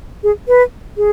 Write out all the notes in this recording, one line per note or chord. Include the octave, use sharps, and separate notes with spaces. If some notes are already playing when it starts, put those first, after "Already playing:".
G#4
B4
G#4